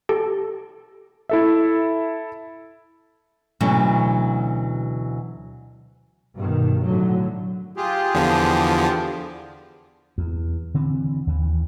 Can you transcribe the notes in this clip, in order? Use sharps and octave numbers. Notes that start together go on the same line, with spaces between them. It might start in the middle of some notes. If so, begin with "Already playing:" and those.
G4 A4 A5
E4 A4 E5
D2 B2 E3 F#3 C#4
G2 B2 D#3
A2 D3 F#3
F4 G4 G#4
E2 D3 F3
E2
D3 E3 C4
D#2 E3